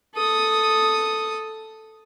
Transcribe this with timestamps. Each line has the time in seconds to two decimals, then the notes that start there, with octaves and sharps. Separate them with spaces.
0.15 A4 D#6